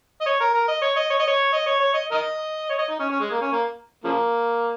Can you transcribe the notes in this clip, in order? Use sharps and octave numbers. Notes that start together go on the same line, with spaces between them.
D#5
C#5
A#4
A#4
D#5
C#5
D#5
C#5
D#5
C#5
D#5
C#5
C#5
D#5
A#4 D#5
C#5
D#5
D#4
C#4
C#4
G#3
A#3
C#4
A#3
C#3 F3 A#3